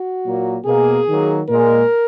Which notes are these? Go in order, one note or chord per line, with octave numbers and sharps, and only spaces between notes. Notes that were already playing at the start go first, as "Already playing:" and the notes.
Already playing: F#4
A#2 F#3 A#3
B2 A#3 G#4
D#3 F#3 A#3
A#2 G#3 A#4